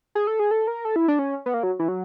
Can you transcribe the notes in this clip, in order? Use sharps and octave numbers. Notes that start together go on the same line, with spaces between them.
G#4
A4
G#4
A4
A#4
A4
E4
D4
C#4
B3
A#3
F#3
E3
F#3